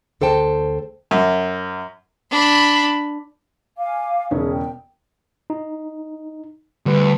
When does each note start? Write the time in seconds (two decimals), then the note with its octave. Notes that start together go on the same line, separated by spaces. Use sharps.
0.21 D2 A4 C5 G5 A5
1.11 F#2
2.31 D4 B5
3.78 F5 G#5 D6
4.31 E1 C#3 C#4 G#4
4.52 G5
5.50 D#4
6.86 D2 G3 B4